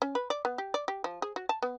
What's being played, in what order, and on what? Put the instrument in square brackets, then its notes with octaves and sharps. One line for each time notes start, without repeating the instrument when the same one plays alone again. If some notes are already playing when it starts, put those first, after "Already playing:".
[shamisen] C#4
B4
D5
B3
G4
D5
G4
F3
G#4
F#4
A5
B3